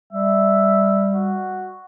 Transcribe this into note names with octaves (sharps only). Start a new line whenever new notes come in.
G3 E5
F#4